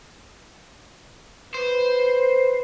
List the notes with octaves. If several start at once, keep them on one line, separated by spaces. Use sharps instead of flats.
B4 C5